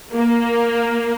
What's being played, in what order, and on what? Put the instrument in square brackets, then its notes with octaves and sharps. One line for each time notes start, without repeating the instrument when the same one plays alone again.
[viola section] A#3